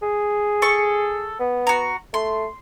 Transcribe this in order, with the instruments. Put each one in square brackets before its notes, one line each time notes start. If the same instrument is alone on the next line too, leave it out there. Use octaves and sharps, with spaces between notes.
[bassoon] G#4
[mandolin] A4 C#6
[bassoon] B3
[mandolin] F#4 A#5
[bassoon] A3 [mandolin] C6